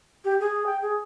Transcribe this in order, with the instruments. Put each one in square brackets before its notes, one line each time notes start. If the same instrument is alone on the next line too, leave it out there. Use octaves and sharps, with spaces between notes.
[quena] G4
G#4
G5
G#4